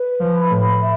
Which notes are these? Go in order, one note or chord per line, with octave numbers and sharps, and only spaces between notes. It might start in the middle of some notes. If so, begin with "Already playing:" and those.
Already playing: B4
F3
B5
A2
E5